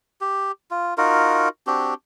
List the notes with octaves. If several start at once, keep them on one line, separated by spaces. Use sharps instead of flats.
G4
F4
D#4 F4 F#4 A#4
C4 D4 F#4 G4